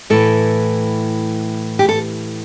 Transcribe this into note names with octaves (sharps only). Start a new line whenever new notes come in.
A2 E3 A4
G4
A4